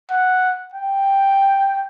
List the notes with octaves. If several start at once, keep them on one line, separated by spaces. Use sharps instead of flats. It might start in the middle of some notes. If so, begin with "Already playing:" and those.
F#5
G5